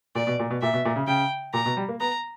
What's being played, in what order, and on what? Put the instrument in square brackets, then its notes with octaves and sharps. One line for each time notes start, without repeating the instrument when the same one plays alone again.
[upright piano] A#2 [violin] D5
[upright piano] B2
A#2
B2
[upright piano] A#2 [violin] E5
[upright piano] B2
A#2
C#3
[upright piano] C#3 [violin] G5
[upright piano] A#2 [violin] A#5
[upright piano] B2
G3
A#3
[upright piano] B3 [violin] A#5